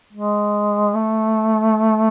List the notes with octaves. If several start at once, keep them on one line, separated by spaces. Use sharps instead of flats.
G#3
A3